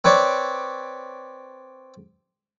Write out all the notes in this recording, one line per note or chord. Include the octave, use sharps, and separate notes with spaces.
C4 B4 C#5 D5